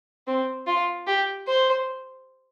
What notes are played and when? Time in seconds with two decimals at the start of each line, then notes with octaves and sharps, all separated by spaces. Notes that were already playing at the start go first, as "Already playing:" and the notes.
0.27 C4
0.67 F4
1.07 G4
1.47 C5